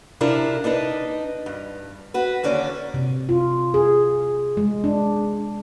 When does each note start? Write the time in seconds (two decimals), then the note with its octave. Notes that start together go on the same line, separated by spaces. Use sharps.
0.21 C3 D4 E4 F4 A#4
0.64 D4 D#4 B4 D#5
1.46 G2
2.14 F#4 B4
2.43 D#2 D3 C#4 D5
2.94 C3
3.29 F4
3.74 G#4
4.57 G#3
4.84 D4